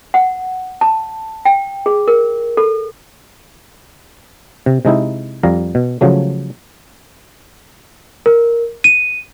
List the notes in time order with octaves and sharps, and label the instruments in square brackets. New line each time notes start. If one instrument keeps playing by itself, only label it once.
[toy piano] F#5
A5
G5
G#4
A#4
A4
[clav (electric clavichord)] C3
C3 G#3 D#4 E4
F2 G3 F5 A#5
B2
C#3 F3 F#3 A3
[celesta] A#4
D#7